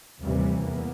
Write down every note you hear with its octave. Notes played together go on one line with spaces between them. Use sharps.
A1 D#2 C3 E3 G3
E2 A#3 B3